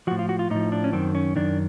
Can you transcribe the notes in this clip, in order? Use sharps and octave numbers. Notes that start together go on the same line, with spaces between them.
A2 F3 F#4
F4
F#4
F4
A2 F3 D#4
D4
C#4
F#2 D#3 C4
C#4
F#2 D#3 D4